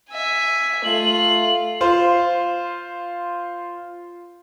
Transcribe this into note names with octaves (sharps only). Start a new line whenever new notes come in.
E5 G#5
A3 F4 F#7
F4 C5